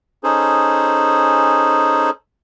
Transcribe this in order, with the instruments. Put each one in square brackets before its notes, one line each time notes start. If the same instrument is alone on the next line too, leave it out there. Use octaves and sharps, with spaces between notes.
[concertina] C#4 D#4 G#4 A4 C5